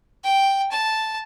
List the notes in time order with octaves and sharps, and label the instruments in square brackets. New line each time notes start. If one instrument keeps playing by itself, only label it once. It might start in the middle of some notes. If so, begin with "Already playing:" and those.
[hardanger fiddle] G5
A5